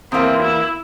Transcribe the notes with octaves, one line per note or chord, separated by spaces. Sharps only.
E2 E3 A#3 C4
E4